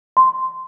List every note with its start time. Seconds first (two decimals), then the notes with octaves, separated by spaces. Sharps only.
0.17 C6